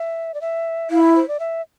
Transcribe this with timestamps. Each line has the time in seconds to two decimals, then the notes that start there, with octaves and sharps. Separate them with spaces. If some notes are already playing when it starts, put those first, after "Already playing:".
Already playing: E5
0.34 D5
0.41 E5
0.90 E4 F5
1.02 E5
1.16 C5
1.28 D5
1.39 E5